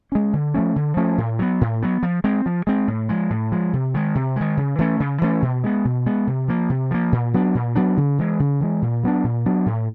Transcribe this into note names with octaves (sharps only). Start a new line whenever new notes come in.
G#3 C#4
D3
F3 A3 C#4
D3
F3 A3 C#4
A2
F#3 B3
A2
F#3 B3
F3
G#3 C4
F3
G#3 C4
A2
F3 G#3
A2
F3 G#3
C3
D#3 G#3
C3
D#3 G#3
C#3
E3 A3 C#4
C#3
E3 A3 C#4
B2
G#3 B3
B2
G#3 B3
C3
F3 A#3
C3
F3 A#3
A#2
F#3 B3 D4
A#2
F#3 B3 D4
C#3
E3 G#3
C#3
E3 G#3
A#2
F#3 B3 D4
A#2
F#3 B3 D4
A2